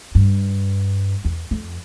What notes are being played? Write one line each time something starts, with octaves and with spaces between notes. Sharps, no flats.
G2
E2
F2